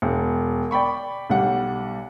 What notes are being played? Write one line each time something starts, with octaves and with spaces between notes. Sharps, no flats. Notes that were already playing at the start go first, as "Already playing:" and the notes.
E1
D5 G5 B5 C#6
B1 G3 F#5